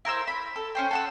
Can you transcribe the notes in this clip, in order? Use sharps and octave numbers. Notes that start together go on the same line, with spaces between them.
E4 A#4 C5 E6
B5
A4
C#4 C5 G5
A4 F#5 E6